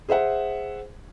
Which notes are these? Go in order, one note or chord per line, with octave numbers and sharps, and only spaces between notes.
G#4 C5 E5 F#5